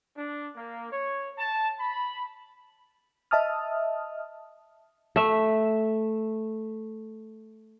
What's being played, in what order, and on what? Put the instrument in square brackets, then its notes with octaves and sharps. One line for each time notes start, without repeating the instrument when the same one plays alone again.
[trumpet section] D4
A#3
C#5
A5
B5
[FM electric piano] D#5 E5 A5 D#6 F6
[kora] A3 E5